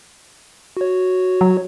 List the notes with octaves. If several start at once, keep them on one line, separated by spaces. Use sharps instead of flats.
F#4 C#5
F#3